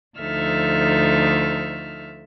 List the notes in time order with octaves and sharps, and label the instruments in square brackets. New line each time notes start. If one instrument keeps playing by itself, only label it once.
[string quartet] D2 F3 D#4 A4 E5 F6